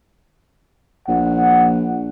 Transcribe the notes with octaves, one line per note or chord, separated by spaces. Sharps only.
A#1 F#5